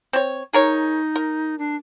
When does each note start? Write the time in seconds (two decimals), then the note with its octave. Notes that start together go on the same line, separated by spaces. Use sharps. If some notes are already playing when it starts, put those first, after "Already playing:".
0.13 C4 C#5
0.53 D#4 G#4 A#4 C#5
1.16 A#4
1.59 D4